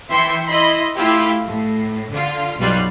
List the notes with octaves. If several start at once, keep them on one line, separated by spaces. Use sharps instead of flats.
E3 E4 E5 G5 C6 C#7
E4 D#5 B5 C6
A3 E4 F4 G4
A2
D3 F4
B1 B2 G3 F4 F#6